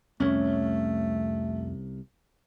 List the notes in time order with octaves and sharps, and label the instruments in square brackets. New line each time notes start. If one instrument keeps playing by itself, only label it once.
[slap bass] C2 [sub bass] F2 [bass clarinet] A3 [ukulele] C#4 C#5